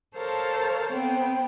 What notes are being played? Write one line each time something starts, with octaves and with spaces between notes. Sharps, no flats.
A4 A#4 C5 C#5 F5 A5
B3 C4 G5